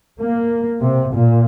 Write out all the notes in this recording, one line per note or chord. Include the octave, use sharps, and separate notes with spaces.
A#3
C3
A#2